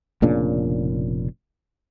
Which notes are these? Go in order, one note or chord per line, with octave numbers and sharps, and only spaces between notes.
F1 A#2 C#3 D4